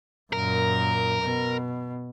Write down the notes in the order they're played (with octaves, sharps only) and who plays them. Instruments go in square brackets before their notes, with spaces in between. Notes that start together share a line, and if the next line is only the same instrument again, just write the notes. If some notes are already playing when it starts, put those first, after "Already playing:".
[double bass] F#2 A#2 [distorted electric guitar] A#4
[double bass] B2